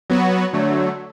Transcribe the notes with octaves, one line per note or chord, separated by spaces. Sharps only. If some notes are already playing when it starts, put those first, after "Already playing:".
F#3 B3 F#4
D3 F#3 A3